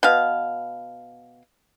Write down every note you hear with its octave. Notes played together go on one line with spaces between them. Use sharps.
B2 F5